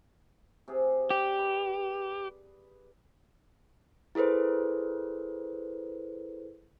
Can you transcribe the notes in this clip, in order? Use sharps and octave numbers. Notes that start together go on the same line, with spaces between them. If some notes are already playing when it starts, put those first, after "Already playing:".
C3 G#4
G4 D5
B4
E4 G#4 A4 B4 C5